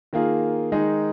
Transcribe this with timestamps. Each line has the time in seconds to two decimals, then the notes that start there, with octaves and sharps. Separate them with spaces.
0.13 D#3 A#3 F4 G#4
0.72 D#3 G#3 D#4 G#4